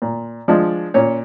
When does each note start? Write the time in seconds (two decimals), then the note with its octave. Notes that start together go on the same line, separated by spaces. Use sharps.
0.02 A#2
0.48 F3 G#3 D4 D5
0.94 A#2 C#4 C#5